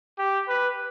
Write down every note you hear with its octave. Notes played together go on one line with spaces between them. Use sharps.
G4
B4